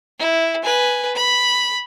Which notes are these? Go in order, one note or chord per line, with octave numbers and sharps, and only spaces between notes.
E4
B4 G#5
B5